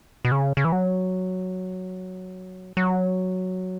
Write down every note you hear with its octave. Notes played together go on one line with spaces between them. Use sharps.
B2
C#3
C#3
E3
F#3
F#3